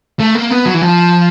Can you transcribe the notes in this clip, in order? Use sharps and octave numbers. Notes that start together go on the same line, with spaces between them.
A3
A#3
B3
F#3
E3
F3